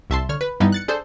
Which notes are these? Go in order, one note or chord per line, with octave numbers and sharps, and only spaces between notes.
C2 E5 A5 C6
D3 C#5 F6
B4
G2 E3 G3 B3 D4 D#4
F#6 A6 C#7
D4 G#4 A4 C5